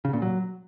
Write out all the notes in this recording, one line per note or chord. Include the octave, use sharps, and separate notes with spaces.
C#3
A#2
F#3